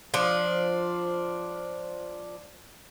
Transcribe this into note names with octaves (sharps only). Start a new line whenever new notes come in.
F3 D4